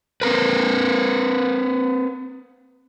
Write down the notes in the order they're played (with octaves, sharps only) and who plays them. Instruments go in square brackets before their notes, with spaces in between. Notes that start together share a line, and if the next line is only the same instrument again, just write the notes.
[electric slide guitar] C4 A#4 B4